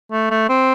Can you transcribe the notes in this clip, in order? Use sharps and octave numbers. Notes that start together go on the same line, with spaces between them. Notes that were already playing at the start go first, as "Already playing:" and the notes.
A3
A3
C4